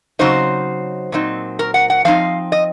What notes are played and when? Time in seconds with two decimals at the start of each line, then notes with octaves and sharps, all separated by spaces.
0.19 C#3 F#3 C4 D#4 C5
1.12 A#2 F#3 C4 D#4
1.59 A#4
1.74 F#5
1.90 F#5
2.05 F3 C4 D#4 F5
2.52 D#5